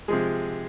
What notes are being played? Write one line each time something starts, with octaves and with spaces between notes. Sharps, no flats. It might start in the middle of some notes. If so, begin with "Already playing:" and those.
C3 F3 G#3 G#4